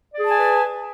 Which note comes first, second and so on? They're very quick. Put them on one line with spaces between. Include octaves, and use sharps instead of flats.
D5 G#4 A5 G#5 B4